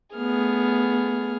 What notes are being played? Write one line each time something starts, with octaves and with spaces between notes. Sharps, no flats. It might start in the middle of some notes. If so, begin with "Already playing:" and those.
A3 B3 G#4 F6